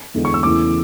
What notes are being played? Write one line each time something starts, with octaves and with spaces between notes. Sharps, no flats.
E2 D3 G#3
C#6
E6
E2 C#3 E3 A3 D6